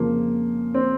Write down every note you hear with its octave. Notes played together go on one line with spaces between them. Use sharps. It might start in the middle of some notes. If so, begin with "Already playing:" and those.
Already playing: F2 C#3 F3 G#3 A#3
C4